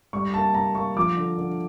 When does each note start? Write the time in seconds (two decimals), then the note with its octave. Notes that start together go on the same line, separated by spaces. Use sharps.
0.13 G3 C#6
0.34 A#3 A5
0.54 A#3 A#5
0.75 A#3 C#6
0.96 F3 D6
1.17 D3
1.38 D3